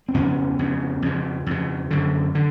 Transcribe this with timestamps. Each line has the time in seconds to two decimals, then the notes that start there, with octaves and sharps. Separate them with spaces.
0.08 C4
0.14 F2 C#3 B3 C#4
0.59 F2 C#3
1.02 F2 C#3
1.46 F2 C#3
1.91 F#2 D3
2.35 D3